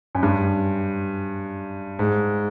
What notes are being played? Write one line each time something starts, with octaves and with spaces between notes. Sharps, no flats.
F#2
G2
G#2